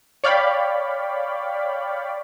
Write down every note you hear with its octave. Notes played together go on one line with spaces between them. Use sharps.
C#5 D5 F5 G5 B5